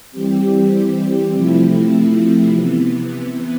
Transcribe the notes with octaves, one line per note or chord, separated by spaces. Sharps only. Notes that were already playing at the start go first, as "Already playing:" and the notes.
E3 G3 C4 G4
C3 F3 A3 C4 E4
C3 E3 B3